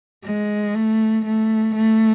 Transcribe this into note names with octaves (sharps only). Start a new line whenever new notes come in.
G#3
A3
A3
A3